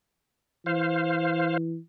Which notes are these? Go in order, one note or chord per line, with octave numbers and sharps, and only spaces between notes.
E3 C5 F5